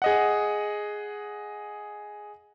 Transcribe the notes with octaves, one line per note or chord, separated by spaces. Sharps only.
G#4 D#5 F#5